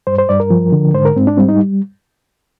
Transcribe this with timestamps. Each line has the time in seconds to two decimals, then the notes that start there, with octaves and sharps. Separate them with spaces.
0.07 G2 C5
0.18 C5
0.29 G2 D5
0.40 A#4
0.50 F3
0.72 D3
0.94 G#2 C5
1.05 A#4
1.16 G#2 C4
1.27 D4
1.37 G3 C4
1.48 D#4